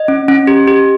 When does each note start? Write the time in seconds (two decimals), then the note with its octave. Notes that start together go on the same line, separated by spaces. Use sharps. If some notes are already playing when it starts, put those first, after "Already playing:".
Already playing: D#5
0.08 C#4
0.28 C#4
0.47 G4
0.67 G4